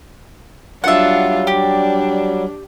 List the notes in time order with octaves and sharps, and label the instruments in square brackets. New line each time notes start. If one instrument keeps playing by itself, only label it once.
[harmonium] F#3 G3 [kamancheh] D4 F4 [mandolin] E5 F#5
[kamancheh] D4 [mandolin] G4